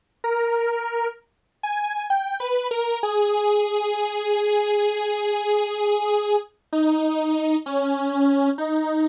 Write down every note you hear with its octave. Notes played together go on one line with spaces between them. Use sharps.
A#4
G#5
G5
B4
A#4
G#4
D#4
C#4
D#4